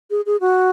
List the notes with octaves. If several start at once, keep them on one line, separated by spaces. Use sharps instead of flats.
G#4
G#4
F#4